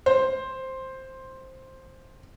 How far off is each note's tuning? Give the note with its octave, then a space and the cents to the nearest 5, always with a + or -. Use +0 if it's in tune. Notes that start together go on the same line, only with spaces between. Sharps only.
C5 +5